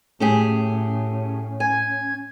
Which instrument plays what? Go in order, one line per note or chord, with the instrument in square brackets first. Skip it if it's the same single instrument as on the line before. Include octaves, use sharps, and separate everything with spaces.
[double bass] A2 [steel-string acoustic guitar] A3 G4 G#4 [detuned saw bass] C#4
[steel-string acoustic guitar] G#5 [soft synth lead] G#6